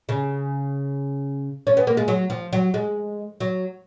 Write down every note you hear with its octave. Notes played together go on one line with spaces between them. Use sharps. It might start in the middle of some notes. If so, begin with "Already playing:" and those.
C#3
C#4
B3
A#3
G#3
F#3
F3
F#3
G#3
F#3